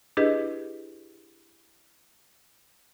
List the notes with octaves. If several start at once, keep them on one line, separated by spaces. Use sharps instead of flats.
D4 E4 G4 G#4 B4 D#5